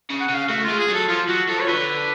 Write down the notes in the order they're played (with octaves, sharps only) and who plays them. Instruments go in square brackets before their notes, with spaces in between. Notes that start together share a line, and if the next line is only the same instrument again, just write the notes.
[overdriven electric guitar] C#3
[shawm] F#5
[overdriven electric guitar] C#3 [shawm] F5
[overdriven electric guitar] A3 [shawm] F#4
[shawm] F4
[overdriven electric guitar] G#3
[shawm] G#4
[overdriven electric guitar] F#3 [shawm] A4
[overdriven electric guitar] F3 [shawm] F4
[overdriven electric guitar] F#3 [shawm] F#4
[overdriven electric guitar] F3 [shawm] A4
[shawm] C#5
[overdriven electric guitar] D3 [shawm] B4